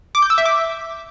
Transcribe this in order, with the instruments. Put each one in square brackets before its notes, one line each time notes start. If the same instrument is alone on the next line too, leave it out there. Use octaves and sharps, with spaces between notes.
[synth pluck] D6
G6
E6
E5
D6